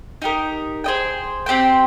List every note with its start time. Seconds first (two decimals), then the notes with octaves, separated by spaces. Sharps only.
0.22 D#4 G4 A#4
0.84 G#4 C5 D#5 G5
1.46 C4 G4 C5 G5